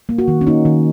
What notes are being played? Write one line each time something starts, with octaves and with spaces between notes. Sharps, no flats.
A#3
F#4
D#3
C#4
A#3 D#4
D#3